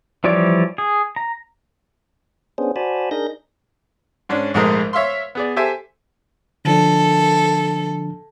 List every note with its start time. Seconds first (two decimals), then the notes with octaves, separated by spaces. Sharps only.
0.24 E3 F3 G3 C#5 D5
0.78 G#4
1.16 A#5
2.58 B3 C#4 D4 G#4 C5
2.76 F#4 C5 D5 G#5 A5 B5
3.11 D4 D#4 G#4 A#4 G6 A#6
4.29 G#2 C#4 D4
4.54 A#1 G#2 G#3 A3 A#4 D#5
4.93 C#5 E5 F5 C6
5.35 B3 G#4 D5
5.56 G4 A4 C5 E5 G#5
6.65 D3 F3 D4 A4